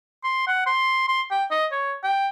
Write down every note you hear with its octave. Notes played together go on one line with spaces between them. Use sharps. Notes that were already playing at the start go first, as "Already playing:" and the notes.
C6
F#5
C6
C6
G5
D#5
C#5
G5